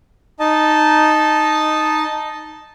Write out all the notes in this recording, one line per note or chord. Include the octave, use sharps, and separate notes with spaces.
D#4 D#5 A5